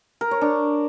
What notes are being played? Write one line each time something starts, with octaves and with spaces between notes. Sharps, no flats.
A#4
C#5
D4